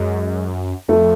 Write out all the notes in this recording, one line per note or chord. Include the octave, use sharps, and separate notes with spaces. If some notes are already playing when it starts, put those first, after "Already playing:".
Already playing: F#2 G#3
F2 A3